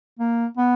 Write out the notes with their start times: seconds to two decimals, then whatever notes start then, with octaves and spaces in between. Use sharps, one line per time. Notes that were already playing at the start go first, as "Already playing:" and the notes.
0.19 A#3
0.57 B3